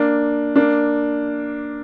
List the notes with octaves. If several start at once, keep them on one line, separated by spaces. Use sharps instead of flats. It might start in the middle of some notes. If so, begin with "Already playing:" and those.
Already playing: A#3 D4
A#3 D4